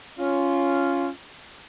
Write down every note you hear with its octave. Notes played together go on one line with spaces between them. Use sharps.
C#4 F4